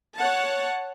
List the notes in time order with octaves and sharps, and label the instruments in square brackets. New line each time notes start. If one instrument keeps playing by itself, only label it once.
[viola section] C#5 F#5 A5